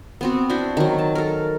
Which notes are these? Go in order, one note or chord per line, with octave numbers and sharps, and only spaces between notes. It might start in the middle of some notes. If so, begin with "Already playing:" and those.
B3 C4 F#4
D4 E4 F#4 C5
D#3 F#3
A5
A4 A#4